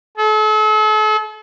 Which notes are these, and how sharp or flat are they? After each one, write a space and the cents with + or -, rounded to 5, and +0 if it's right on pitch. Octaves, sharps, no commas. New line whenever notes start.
A4 -40